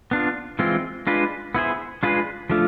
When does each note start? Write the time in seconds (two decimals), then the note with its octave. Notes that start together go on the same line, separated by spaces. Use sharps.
0.11 B3 D4 F4
0.59 E3 G#3 C4 F4
1.07 G#3 D4 F4 B4
1.55 B3 E4 G#4 C5
2.03 G#3 D4 F4 G#4 B4
2.50 F3 A3 D4 F4